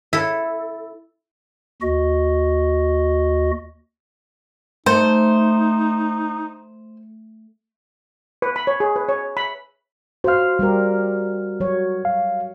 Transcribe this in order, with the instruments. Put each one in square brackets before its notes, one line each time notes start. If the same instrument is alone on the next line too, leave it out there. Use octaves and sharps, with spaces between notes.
[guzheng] E4 A4
[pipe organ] D#2 F#4 D#5
[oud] A3 [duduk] D#4 [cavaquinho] C5
[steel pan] B4
B5
C#5
G#4
B4
C#5
B5
[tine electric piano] F#4 F6 [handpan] C5 F5
[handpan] G3 G4 A#4
F#3 C#5
[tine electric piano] F5